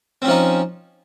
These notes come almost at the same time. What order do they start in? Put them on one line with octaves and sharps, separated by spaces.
C4 C#4 F3 D#4